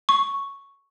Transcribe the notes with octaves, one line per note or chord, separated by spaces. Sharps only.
C#6